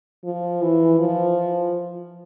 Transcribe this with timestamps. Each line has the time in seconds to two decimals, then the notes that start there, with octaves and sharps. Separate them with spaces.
0.25 F3
0.62 E3
0.99 F3